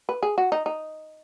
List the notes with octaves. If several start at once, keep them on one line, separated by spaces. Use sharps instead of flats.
B4
G#4
F#4
D#4
D#4